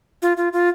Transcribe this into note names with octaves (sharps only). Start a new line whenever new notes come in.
F4
F4
F4